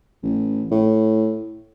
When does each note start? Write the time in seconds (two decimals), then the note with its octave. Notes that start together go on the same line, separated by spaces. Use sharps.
0.23 A1
0.71 A2